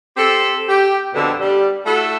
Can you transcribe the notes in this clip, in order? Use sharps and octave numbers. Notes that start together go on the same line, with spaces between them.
C4 G4 A4
G4
F2 B2 D3
G3
A3 E4 F#4 A4